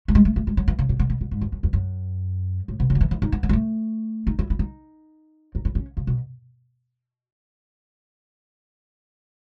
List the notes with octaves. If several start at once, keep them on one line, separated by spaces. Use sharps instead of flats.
A3
G#3
A3
A3
G#3
F#3
E3
C#3
B2
B2
B2
B2
G#2
E2
F#2
E2
F#2
A2
B2
C#3
F#3
E3
E3
D#4
B3
B3
G#3
A3
D#4
E4
E4
D#4
D#4
E4
C#4
C#3
B2